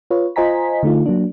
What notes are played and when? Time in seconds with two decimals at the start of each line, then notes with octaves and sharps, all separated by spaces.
0.11 F4 B4 C#5
0.36 F4 C5 D#5 G#5 A#5 B6
0.83 D3 A3 D#4 F4
1.06 F#3 A#3 D4